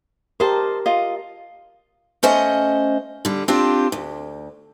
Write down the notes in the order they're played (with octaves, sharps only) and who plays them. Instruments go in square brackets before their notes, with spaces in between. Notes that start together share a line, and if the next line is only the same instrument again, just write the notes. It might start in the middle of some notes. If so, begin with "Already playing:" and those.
[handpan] G4 A#4 [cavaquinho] C5 D#5 A5
[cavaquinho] F4 D#5
[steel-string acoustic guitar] A3 C#4 C5 D#5 F#5
D3 G3
C4 D4 F4 G4 C5
D2